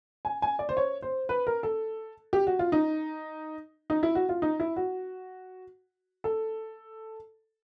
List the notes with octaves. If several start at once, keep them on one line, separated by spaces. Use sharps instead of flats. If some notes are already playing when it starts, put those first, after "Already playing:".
G#5
G#5
D5
C5
C#5
C5
B4
A#4
A4
G4
F#4
F4
D#4
D#4
E4
F#4
F4
D#4
E4
F#4
A4